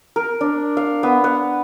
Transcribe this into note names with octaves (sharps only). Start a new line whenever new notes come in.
A#4
D4
F5
B3
F#5